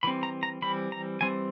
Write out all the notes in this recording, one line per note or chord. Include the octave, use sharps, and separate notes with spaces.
E3 G3 C4 B5
A#5
A#5
E3 G3 C4 B5
A#5
E3 G3 C4 G#5